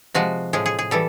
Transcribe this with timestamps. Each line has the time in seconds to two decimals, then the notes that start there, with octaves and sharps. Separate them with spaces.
0.14 C3 F3 G#3 F#4
0.53 A2 F3 G#3 G#4
0.66 G#4
0.79 G#4
0.91 E3 G3 A4